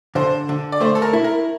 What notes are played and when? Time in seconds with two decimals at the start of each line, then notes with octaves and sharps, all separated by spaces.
0.15 D3 C5
0.49 D3
0.72 D5
0.80 A3 C5
0.95 A4
1.02 A#4
1.13 E4
1.24 A#4